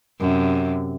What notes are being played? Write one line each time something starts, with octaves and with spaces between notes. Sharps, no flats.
F#2 C3